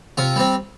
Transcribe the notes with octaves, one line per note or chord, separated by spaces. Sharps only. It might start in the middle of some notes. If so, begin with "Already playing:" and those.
C3 F4
G3 C4